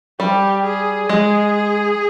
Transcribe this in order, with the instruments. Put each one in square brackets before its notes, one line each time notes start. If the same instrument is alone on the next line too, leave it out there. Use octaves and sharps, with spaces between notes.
[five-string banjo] G3 [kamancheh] G4
[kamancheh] G#4
[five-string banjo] G#3 [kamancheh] G#4